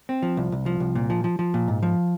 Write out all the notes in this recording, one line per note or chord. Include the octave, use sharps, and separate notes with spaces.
C4
F3
C2
C2
F3
C2
A#2
F3
F3
F3
A#2
G#2
F3